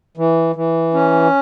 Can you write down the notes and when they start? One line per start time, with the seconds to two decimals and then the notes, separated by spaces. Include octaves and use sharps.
0.17 E3
0.56 E3
0.94 C#4